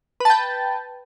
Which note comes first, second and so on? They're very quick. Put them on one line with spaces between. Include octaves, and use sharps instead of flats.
B4 A5 G5